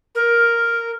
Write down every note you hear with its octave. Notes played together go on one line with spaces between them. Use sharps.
A#4